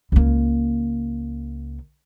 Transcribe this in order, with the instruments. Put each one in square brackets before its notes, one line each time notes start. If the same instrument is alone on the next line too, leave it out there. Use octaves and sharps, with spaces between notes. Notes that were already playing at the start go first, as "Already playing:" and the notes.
[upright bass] C#2 A#3